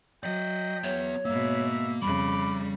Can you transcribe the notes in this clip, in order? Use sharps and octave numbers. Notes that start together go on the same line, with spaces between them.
F#3 D5 D#5 G5
B3 C#5 E5
G#2 B2 A#3 E5
F2 C#3 G3 B5 D6